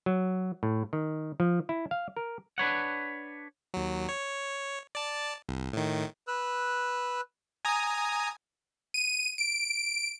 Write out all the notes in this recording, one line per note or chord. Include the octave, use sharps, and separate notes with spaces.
F#3
A2
D#3
F3
E4
F5
A#4
D4 B4 C#5 F#5
D#2 F#3
C#5
D5 A5
C2
A2 D#3
B4 E6 F#6
G#5 A#5 D#6
D#7
D7